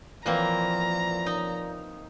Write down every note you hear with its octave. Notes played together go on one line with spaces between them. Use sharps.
A#2 E3 F3 A#3 C4 A#5
D#4